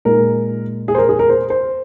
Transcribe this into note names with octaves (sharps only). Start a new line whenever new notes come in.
A#2 G#3 D#4 A#4
G#4
C5
A#4
G#4
A#4
C5
C5